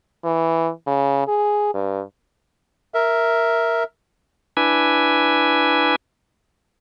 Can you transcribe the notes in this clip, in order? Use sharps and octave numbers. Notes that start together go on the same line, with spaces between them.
E3
C#3
G#4
G2
A#4 E5
D4 E4 B4 G#5